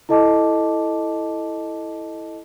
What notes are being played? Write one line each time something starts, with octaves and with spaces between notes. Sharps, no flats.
E4 A4 D#5 A5 D6